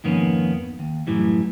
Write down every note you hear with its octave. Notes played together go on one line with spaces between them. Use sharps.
F2 G#2 D#3 A#3 B3 C#4
D#2
F#2 A2 E3 G3